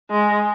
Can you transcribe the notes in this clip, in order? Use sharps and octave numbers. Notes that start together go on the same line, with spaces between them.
G#3